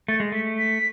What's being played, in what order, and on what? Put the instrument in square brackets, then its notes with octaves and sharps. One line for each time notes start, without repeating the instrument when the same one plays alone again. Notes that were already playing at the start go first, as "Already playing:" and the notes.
[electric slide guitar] A3 [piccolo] A6
[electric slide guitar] G#3
[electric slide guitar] A3 [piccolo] B6
[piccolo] B6